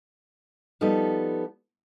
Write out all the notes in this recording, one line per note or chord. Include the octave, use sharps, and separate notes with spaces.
F3 G3 B3 D#4 A4